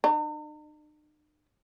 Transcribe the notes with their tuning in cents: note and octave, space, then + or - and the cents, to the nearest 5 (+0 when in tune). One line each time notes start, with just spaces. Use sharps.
D#4 -45